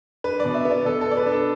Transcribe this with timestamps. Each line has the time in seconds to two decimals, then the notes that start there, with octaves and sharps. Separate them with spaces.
0.24 D4 B4
0.40 D5
0.45 B2
0.54 E5
0.65 B3
0.71 D5
0.85 B2 A4
1.01 A4
1.07 B3 D5
1.17 B4
1.26 D4
1.32 A4